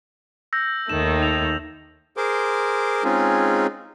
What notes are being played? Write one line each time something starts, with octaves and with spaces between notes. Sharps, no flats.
E6 G6 A#6
D#2 D#3 A3 E7
F7
G#4 A#4 C5 C6 D6
G#3 C4 C#4 D#4 F4 G#4